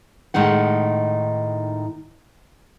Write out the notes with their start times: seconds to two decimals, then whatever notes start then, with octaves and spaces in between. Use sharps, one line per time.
0.34 A2 D#3 G#3 D#4 F#5